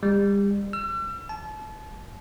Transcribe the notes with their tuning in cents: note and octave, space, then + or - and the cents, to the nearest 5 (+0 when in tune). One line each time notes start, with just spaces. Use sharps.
G3 +35
E6 +40
A5 -30